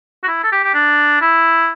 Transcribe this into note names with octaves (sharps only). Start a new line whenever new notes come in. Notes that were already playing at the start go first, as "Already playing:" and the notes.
F#4
E4
A4
G4
G4
D4
E4